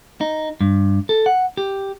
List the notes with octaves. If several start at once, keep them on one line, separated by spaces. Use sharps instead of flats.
D#4
G2
A4
F#5
G4